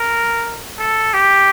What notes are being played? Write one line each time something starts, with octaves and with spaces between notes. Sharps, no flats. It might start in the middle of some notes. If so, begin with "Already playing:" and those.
Already playing: A#4
A4
G4